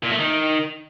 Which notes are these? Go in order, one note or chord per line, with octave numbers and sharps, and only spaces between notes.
A#2
A3
D#3